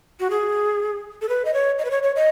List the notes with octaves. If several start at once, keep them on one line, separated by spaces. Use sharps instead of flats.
F#4
G#4
A4
B4
D#5
C#5
D#5
B4
C#5
C#5
D#5